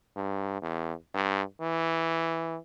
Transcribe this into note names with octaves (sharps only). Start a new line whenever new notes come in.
G2
E2
G2
E3